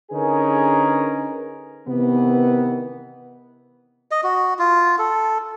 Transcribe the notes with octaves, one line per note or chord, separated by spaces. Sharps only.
D3 C#4 D#4 G#4 A#4 B4
C3 D#3 E3 B3
D#5
F#4
F4
A4